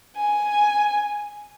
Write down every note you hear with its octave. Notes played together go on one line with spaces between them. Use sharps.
G#5